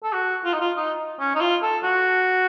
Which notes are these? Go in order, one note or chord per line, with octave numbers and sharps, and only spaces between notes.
A4
F#4
F4
D#4
F4
D#4
C#4
D#4
F4
A4
F#4